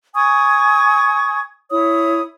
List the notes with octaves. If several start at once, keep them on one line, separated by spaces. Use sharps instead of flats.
G#5 C#6 D#6 G#6
E4 C#5 D#6